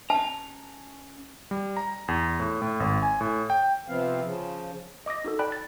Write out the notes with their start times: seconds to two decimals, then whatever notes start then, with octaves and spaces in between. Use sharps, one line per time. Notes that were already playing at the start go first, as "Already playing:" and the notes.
0.10 C#4 A5 A#5
1.51 G3
1.77 A#5
2.08 E2
2.40 A2
2.62 A2
2.80 G#1
3.02 G#5
3.21 A2
3.50 G5
3.88 C3 F3 B3 C4 F5
4.24 C#3 F3
5.06 D#5 D6 D#6 A#6
5.25 D#4 F#4 A4
5.39 D5 G5 A5 B5 F#6
5.52 A6